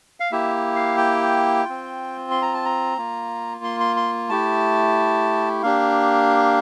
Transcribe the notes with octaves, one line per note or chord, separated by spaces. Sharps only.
F5
A#3 E4 G4 E5
F5
G5
C4 F4
C6
A#5
A5
A#5
A#3 F4
C6
C6
C6
A3 E4 G4 A5
A#3 D4 G4 F5